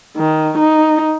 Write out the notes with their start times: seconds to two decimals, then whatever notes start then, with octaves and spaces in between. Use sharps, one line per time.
0.17 D#3
0.58 D#4